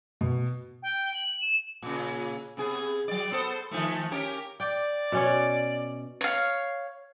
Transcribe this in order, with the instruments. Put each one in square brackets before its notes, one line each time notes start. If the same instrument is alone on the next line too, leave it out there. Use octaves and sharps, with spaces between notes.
[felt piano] B2
[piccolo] G5
F#7
E7
[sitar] A#2 C#3
C3 B3 G#4
F#3 D5
B3 A4 C5
D#3 F3 A3
C#4 G4 A#4
[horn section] D5 [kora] G5
[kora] B2 C#4 C#5
[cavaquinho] C#5 F5